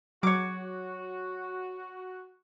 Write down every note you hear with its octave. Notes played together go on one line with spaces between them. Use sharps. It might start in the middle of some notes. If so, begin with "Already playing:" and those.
F#3 F#4 C#5 D6